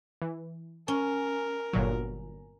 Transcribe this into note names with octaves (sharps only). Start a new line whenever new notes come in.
E3
C#4 A#4
G1 A#2 F#3